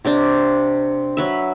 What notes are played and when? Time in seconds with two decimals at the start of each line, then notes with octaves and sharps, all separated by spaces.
0.05 C3 C4 D4
1.17 F#3 B4 E5